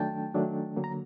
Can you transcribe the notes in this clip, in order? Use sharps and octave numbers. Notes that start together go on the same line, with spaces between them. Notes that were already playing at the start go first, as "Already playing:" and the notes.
Already playing: D#3 F#3 A3 D4 G5 A5
D#3 F#3 A3 D4
D3 F#3 A#3
A#5